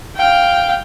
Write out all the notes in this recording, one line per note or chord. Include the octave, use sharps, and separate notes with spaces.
F5 G5